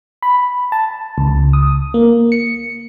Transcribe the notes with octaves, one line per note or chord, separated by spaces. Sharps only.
B5
A5
C#2
D#6
A#3
C#7